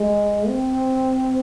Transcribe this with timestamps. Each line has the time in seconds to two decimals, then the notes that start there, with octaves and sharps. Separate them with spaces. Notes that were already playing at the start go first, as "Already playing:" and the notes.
Already playing: G#3
0.48 C4